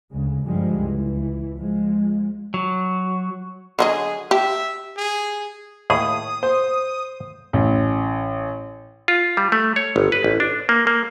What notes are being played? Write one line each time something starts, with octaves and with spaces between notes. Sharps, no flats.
D2 C#3 G#3
G2 D3 F3 G3 G#3
C#2 E3
F3 G#3
F#3
D3 F#3 G#4 D#5
G4 E5
G#4
D#2 A2 G#4 D#6
C5
A1
F4
G3
A3
C#5
G1
B4
A1
D4
A#3
A#3